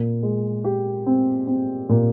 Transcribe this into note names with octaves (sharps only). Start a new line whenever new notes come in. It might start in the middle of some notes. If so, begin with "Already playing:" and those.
Already playing: A#2
G#3
G4
C4
C4
A#2